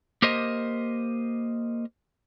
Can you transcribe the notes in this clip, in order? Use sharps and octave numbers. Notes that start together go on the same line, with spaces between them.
A#3 G4 A#4 C5 D#5